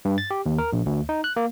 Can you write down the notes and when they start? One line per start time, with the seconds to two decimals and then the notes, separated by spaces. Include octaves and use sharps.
0.05 G2
0.18 A6
0.31 G4
0.46 D#2
0.58 A#4
0.73 A#1
0.86 D2
1.09 D#4
1.24 F#6
1.36 A#3